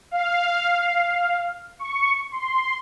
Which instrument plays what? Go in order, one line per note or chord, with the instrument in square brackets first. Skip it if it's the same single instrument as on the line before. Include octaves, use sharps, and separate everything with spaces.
[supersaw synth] F5
C#6
C6